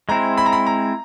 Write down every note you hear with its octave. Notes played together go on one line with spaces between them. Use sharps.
G#3 C4 E4 A#5
B5
A#5
B5
A#5